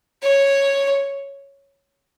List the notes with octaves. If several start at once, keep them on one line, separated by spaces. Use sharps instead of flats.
C#5